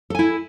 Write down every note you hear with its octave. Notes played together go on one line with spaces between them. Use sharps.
E4 A4 G#5